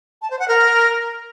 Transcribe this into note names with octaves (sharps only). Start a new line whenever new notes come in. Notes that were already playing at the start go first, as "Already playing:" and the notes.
A5
C5
F#5
A#4